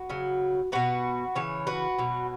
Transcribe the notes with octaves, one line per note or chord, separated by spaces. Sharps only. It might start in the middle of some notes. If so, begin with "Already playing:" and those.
Already playing: F#4 B4
C#3 F#3
B2 F#3 F#4 B4
C#3 E3 C#5
F#4 B4
B2 F#3